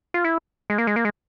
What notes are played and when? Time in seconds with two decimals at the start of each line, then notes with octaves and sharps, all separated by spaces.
0.14 F4
0.24 E4
0.70 G#3
0.78 A#3
0.87 G#3
0.96 A#3
1.05 G#3